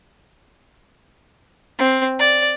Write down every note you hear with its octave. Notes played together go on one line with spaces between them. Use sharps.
C4
D5